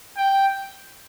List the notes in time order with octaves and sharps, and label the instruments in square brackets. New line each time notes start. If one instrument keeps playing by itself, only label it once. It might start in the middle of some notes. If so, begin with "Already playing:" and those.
[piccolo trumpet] G5